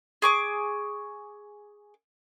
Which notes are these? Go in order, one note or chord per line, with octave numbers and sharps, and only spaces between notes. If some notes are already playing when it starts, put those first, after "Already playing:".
G#4 C#6 D6